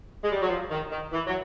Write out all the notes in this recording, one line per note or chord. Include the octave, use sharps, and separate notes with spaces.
G#3
G3
F#3
F3
D#3
D#3
E3
F#3